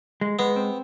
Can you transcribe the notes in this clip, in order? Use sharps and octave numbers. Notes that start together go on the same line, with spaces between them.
G#3
G#3 B3
C4